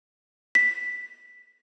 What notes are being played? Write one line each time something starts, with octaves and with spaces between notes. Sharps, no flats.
B6